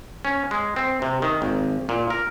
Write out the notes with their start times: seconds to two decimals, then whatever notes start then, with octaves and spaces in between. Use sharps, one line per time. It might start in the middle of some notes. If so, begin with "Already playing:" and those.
0.25 C#4
0.51 G#3
0.76 C4
1.02 C3
1.22 D#3
1.42 G#1
1.89 A#2
2.10 A#4